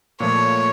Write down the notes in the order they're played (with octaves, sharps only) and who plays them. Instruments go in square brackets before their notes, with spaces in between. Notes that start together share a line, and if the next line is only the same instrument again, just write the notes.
[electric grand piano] A#2 F3 A3 [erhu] C#5